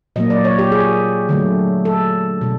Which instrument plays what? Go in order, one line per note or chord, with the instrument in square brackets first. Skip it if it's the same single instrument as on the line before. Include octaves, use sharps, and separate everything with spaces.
[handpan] A#2 F#3 A#3 D#5
D5
C#5
G4
G#4
D3 F#3 A3
A4
B2 G3